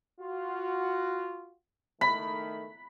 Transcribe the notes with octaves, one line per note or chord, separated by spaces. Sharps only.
F4 F#4
D#3 A3 B5